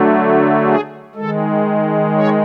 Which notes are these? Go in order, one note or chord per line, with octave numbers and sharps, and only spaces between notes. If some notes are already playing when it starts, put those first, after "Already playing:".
Already playing: D3 F#3 A3
G#4
D#3 G#3 A4
C#5